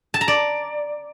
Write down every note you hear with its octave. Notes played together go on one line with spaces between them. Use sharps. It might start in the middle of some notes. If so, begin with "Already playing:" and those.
A5
A#5
D5